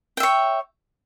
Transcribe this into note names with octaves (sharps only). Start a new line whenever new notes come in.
C#5 E5 G5